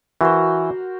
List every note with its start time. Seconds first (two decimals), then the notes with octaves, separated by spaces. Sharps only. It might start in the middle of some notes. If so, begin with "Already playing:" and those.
0.21 E3 F#4 A#4 C5